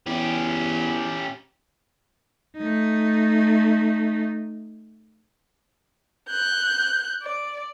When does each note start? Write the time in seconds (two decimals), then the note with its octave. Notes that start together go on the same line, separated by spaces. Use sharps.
0.06 E2 C#4 G4
2.58 A3 D#4
6.29 F#6 G6
7.23 D5